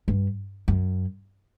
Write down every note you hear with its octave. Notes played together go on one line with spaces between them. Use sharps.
G2
F#2